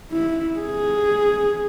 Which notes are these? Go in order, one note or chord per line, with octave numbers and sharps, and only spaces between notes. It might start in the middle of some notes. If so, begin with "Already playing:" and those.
E4
G#4